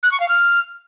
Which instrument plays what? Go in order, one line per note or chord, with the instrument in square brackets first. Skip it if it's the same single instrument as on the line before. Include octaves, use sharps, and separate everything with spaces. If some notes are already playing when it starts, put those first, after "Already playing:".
[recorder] F#6
C#6
F5
F6